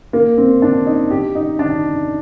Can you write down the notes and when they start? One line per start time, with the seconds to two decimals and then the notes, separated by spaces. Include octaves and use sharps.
0.13 A#3
0.37 C4
0.62 D4
0.86 D#4
1.11 G4
1.35 D#4
1.59 D4